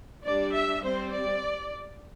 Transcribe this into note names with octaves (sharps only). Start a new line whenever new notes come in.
G3 D4 D5
E5
G3 C4 C5
D5